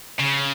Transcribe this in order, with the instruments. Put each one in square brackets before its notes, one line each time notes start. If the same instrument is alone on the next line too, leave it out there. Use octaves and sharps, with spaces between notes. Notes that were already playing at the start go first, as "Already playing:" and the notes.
[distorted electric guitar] C#3